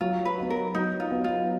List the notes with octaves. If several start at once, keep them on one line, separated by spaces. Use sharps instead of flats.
F#3 F4
B4
B3 D#4
A#4
F#3 D#4
F4
B3 D#4
F4